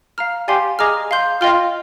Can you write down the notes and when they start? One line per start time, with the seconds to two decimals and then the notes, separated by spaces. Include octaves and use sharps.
0.18 F5 A#5 F6
0.48 G4 D5 F5 G#5 C6
0.79 G#4 D#5 A#5 D6 F6
1.11 F5 C6 G6
1.41 F4 D#5 G5 C6 F6